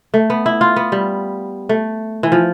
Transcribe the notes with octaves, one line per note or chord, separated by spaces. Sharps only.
A3
B3
E4
F4
B3
G3
A3
E3
F3